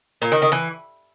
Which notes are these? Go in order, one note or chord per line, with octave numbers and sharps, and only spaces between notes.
A#2
D#3
D#3
E3